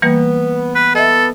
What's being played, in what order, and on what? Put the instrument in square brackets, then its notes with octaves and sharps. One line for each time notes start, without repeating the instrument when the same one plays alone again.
[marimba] E3 G3 A#3 [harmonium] B3
[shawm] B4
[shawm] A4 [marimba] D#5 E5